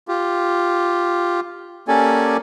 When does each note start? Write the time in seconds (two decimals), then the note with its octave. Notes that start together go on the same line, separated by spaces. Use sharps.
0.08 F4 G4
1.88 A#3 C#4 G4 A4 D5 G#5